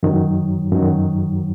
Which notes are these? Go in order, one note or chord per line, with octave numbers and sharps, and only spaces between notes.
F#2 D#3 F#3
F#2 D#3 F#3